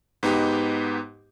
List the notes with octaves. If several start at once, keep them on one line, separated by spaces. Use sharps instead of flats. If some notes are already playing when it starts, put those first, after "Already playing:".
G#2 B3 D#4 G4